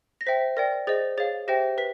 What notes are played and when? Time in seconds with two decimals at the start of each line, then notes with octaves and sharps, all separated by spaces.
0.21 A#6
0.27 C5 E5 G5 B6
0.57 A#4 D5 G5 A#6
0.87 G#4 C5 D#5 A6
1.18 G#4 C#5 F5 A6
1.48 G4 C5 E5 G5 A#6
1.78 B4 B6